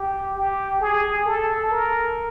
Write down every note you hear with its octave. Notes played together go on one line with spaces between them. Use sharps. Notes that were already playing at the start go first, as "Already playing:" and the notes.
Already playing: G4
G4
G#4
A4
A#4